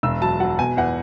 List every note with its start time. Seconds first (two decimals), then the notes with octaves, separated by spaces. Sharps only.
0.03 E1 E6
0.21 F#3 A5
0.40 F#3 F#5
0.59 B2 G#5
0.77 E2 F#5